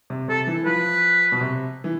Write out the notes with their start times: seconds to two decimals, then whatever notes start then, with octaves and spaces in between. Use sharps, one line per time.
0.10 C3
0.28 C3 A4
0.47 E3
0.65 F3 B4
1.32 B2
1.41 C3
1.84 E3